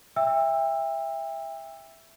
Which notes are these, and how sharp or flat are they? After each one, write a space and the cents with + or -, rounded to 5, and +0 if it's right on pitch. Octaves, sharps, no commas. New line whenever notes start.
E5 +0 G5 +35 E6 +5